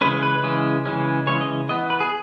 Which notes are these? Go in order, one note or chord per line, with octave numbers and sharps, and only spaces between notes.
C#3 E3 G#3 C#4 B4
B4
C#3 E3 G#3 C#4
C#3 E3 G#3 C#4
C#3 E3 G#3 C#4 C#5
D#5
E3 B3 D#5
B4
G#4